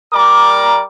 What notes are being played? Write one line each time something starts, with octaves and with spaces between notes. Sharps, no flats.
G3 A#4 D5 A#5 D6